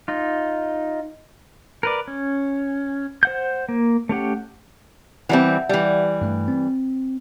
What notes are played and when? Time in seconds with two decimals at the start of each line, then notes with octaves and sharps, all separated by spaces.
0.08 D#4 F4
1.83 A#4 B4 D5
2.08 C#4
3.23 C5 F#5 G6
3.69 A#3
4.09 A3 C#4 G4 F#5
5.29 E3 G3 C4 E5 F#5
5.69 E3 G3
6.21 G2 A3
6.48 C4